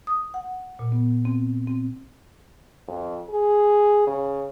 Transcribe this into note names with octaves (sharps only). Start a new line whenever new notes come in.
D#6
F#5
A#2
B3
C4
C4
F2
G#4
C#3